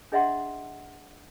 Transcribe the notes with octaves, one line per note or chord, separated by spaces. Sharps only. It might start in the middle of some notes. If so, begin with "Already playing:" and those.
D4 G#4 D#5 E5 F#5 C6